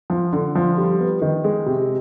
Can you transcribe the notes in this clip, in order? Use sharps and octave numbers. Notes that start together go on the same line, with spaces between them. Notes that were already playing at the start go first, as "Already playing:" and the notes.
F3
D3
F3
G3
B3
D#3
G#3
C3